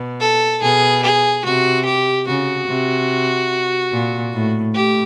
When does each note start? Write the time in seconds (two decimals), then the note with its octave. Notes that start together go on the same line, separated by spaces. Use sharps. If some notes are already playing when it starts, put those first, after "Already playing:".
Already playing: B2
0.20 A4
0.62 B2 G#4
1.03 G#4
1.44 C3 F#4
1.85 G4
2.27 C#3 F#4
2.67 C3
3.91 A#2
4.33 A2
4.74 A2 G4